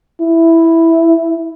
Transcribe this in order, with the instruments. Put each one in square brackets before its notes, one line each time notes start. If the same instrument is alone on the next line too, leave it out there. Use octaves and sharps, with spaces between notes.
[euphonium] E4